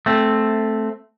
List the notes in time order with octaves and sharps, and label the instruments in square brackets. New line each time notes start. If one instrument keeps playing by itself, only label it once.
[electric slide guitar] A3 C4